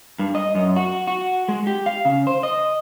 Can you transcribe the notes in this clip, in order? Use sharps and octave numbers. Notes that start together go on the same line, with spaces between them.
G2
D#5
F#2
F#4
F#4
G#3
G4
F5
C#3
C5
D#5